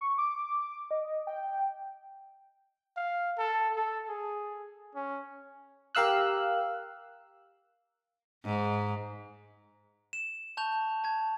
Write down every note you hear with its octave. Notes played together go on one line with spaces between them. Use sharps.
C#6
D6
D#5
G5
F5
A4
A4
G#4
C#4
G4 A#4 F5 E6 F#6
G#2
E7
A5 C#6 G6 F7
A5 G#6